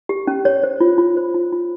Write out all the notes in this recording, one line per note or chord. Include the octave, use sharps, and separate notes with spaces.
G4
C#4
C#5
C5
F4
F4
C5
F4
F4